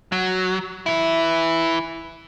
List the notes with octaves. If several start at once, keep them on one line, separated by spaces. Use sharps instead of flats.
F#3
E3 E4